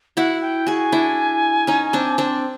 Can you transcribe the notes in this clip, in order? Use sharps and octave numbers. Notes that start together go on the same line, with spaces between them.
E4 F#4 F#5
G5
F#4 G#4 G#5
D4 E4
C#4 D#4
C4 D4
C4 D4